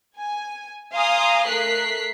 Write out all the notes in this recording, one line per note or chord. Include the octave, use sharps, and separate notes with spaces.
G#5
F5 G#5 A#5 C6 D#6
A3 A#4 F#6 B6 C7